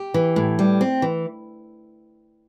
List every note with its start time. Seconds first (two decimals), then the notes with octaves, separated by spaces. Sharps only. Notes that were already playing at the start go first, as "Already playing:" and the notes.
Already playing: G4
0.14 E3
0.36 A2
0.59 G3
0.81 C4
1.02 E3